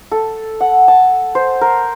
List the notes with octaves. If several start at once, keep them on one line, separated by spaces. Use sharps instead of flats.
A4
F#5
A5
C5
A#4